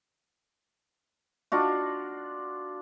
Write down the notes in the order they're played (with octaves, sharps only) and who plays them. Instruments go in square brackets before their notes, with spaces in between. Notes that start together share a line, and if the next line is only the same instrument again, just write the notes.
[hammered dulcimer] D4 F4 F#4